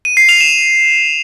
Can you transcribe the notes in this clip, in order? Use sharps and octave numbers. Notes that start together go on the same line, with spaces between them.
D#7
C7
F7
E7